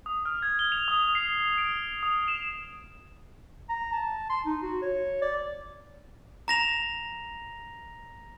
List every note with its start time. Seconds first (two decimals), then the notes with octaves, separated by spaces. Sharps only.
0.06 D#6
0.25 F6
0.42 G#6
0.59 G7
0.72 F7
0.88 D#6
1.15 C7
1.58 D7
2.03 D#6
2.28 E7
3.69 A#5
3.92 A5
4.30 C6
4.46 D#4
4.62 F#4
4.82 C#5
5.22 D5
6.48 A#5 A#6 F7